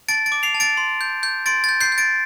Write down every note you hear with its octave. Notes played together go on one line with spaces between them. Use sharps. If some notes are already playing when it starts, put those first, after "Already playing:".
A5 A6 D7
A6 D7
D6
C7 F7
A5
A6 D7
C6
G6
G6
C6 A6 D7
G6 A6
G6 C7
G6
A6 D7